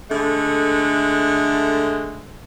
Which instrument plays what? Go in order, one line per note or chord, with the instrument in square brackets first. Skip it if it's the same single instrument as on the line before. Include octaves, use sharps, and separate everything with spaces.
[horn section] D3 G#3 A3